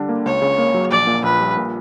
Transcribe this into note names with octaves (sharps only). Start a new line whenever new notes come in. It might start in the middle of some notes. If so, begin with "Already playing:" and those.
Already playing: D3 G3 D4
A#3
C#2 C#5
C#3
A#3
F#3
A#1 D5
A#2
A#1 B4
G3
A#2